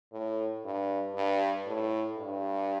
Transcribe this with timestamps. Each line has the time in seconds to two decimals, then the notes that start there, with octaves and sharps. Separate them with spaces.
0.13 A2
0.64 G2
1.15 G2
1.66 A2
2.17 G2